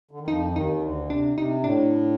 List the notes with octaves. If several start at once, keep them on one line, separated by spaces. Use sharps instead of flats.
D3
D#3
F2 F3 D#4
F3
D#2 D#3 D#4
D#3
D2 D3
C3 D4
C3 D#4
A2 D4